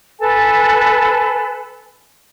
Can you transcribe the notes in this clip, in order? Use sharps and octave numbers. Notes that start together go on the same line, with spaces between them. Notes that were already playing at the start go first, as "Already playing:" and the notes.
A4 B4 G#5 A5